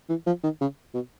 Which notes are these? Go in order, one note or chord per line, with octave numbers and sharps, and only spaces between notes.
E3
F3
D#3
C#3
B2